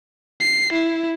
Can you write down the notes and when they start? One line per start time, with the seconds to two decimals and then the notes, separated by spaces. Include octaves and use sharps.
0.40 C7
0.72 E4